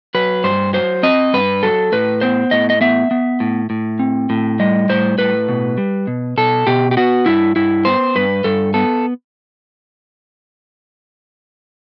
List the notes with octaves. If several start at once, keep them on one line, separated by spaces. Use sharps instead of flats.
F#3 B4
G2 C5
F#3 C5
C4 D#5
G2 B4
F#3 A4
A2 B4
B3 C5
A2 D#5
D#5
B3 E5
B3
A2
A2
C4
A2
G3 D#5
A2 C5
A2 B4
B2
G3
B2
B2 A4
B2 G4
G4
B3 F#4
G2 E4
G2 E4
B3 C5
G2 B4
G2 A4
B3 A4